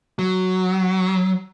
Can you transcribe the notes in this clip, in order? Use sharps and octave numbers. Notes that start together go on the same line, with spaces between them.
F#3